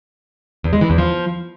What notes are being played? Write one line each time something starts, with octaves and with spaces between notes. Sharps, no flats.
E2
G#3
E3
E2
F3